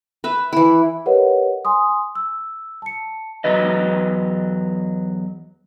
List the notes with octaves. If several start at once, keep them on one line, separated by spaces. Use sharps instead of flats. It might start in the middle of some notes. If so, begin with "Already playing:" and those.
B4 E5
E3 E4
G4 A#4 B4 C#5 D#5 F#5
G#5 C6 D#6
E6
A5 C#7
E2 F#3 B4 D#5